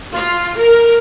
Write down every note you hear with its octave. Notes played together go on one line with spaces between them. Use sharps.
F4
A#4